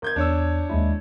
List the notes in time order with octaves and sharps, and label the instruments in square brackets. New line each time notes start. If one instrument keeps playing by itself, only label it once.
[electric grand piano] G1 G6 G#6 [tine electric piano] A#4
[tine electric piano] E2 [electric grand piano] D4 C#5 E6
[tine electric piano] D#2 G#3 E4